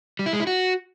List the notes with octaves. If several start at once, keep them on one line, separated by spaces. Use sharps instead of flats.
G3
E4
G#3
E4
F#4